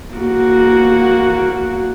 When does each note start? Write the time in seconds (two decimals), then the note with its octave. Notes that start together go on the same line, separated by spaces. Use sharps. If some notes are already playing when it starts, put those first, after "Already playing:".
0.14 A#3 F#4